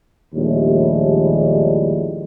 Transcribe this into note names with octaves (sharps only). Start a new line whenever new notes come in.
A#1 D#2 A2 G3 G#3